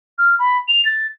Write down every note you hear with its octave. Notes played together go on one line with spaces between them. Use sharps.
F6
B5
F7
A6